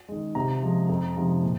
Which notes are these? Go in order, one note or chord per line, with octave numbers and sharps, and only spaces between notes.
D#3 G#3
C3 A#5
F3 G#3
F2
C3 F3 G#3
A#2